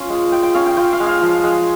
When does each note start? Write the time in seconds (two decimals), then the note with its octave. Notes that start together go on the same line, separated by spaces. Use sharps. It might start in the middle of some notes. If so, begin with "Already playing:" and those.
Already playing: C#4 F4 F5
0.10 G#3
0.32 G#3 G5
0.43 G5
0.54 C#4 F5
0.66 G5
0.77 F4 G5
0.93 F5
1.00 G#3
1.06 F5
1.21 F3
1.44 G#3